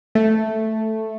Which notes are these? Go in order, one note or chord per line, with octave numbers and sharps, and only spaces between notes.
A3